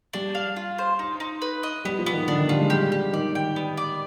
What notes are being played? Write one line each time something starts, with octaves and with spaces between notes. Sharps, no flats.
G3 D4
F5
F4
C5
D#4
D#4
B4
D#5
G3 B3
F3
B3
D#3
D3 D4
D#3
G3 F4
G#3
G3 G4
G4
D#3 D5
G5
B3
D5